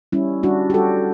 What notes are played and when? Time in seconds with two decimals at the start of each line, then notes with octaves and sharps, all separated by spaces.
0.12 G3 C#4 E4
0.43 G3 D4 F#4
0.70 G4
0.74 G3 F#4 A4